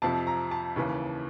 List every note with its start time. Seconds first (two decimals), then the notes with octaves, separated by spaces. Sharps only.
0.02 F2 C3 F3 A5
0.27 A#5
0.51 A5
0.76 D#2 C#3 E3